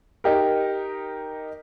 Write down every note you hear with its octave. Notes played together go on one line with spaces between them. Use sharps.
D#4 G4 A#4